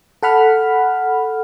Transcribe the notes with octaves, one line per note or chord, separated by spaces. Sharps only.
A4 F#5 B5 F6